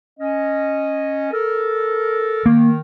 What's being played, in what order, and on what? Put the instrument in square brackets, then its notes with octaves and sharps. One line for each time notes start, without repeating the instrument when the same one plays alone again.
[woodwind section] C#4 D#5
A4 A#4
[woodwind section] D#3 [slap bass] A#3